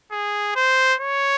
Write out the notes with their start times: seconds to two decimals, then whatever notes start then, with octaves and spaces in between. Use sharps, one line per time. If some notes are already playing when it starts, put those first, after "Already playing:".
0.12 G#4
0.56 C5
1.00 C#5